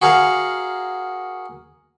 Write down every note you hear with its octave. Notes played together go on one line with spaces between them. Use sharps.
F#4 G#4 A#4 F5 F#5